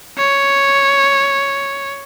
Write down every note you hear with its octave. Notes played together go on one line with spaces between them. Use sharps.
C#5